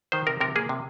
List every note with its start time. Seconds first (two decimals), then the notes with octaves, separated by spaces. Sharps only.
0.12 D#3 C5
0.27 C3 A#4
0.41 C3 A#4
0.56 A#3 G#4
0.69 C3